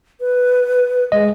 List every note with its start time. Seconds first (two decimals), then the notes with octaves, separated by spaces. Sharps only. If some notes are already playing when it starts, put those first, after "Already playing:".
0.20 B4
1.12 G#3 D#5